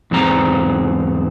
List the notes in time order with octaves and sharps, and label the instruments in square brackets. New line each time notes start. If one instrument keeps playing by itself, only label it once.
[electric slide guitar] E2 G#2 C4 A#5